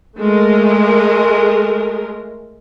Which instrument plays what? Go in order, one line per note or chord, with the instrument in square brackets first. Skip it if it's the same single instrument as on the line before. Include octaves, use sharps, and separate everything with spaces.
[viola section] G#3 A3 A#4